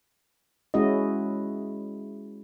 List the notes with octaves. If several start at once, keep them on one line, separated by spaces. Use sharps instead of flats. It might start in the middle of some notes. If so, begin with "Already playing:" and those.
G#3 C#4 E4 F#4 D#5